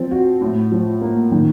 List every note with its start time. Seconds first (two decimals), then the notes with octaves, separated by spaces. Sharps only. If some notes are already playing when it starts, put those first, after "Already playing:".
Already playing: F3 C4
0.11 F#4
0.41 A2
0.72 F3
1.01 A#3
1.31 D#3